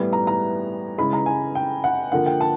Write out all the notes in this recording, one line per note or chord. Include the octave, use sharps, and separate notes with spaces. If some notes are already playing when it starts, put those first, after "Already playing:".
Already playing: A2 E3 G3 B3
A#5
A#5
C#3 E3 G#3 B5
A#5
G#5
G5
F#5
D3 F3 A#3 F#5
G5
A5